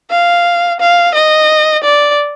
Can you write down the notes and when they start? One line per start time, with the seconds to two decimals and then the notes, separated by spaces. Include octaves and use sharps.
0.10 F5
0.80 F5
1.14 D#5
1.83 D5